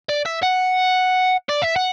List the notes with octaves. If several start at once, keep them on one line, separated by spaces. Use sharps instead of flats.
D5
E5
F#5
D5
E5
F#5